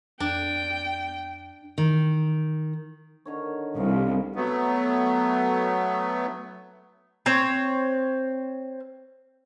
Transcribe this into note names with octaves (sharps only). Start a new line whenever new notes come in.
F2 D4 G5
D#3
D3 D#3 C#5
C2 F5
F#3 A3 B3
C4 C#5